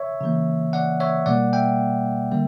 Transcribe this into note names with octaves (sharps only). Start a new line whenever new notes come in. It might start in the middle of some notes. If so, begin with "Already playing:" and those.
Already playing: C#5 E5
C#3 E3 A#3
D5 F#5
C#5 E5
B2 G3 A#3 D5 F#5
E5 G5
D3 G3 A#3